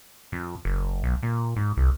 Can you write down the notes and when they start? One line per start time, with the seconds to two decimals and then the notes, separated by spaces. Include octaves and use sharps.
0.32 F2
0.65 F#1
1.03 B1
1.23 A#2
1.56 G#2
1.77 C2